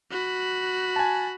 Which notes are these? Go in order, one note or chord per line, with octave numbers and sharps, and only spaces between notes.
F#4 B5
G#5 A5